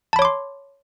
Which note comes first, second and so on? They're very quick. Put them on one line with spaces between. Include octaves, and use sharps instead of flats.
A5 B5 C#5 D6 C6